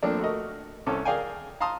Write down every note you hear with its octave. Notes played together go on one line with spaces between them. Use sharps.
F3 A3 A#3 C4 D4
A3 F#4 A#4 D#5
C2 C#4 A4 D6
G#4 A#4 D5 F5 G5 G#5
F5 A5 A#5 C6 D#6